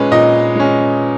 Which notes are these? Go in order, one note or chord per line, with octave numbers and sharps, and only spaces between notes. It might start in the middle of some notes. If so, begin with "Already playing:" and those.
Already playing: A#2 G#3 C#4 B4
A#2 D#5
G#3 C#4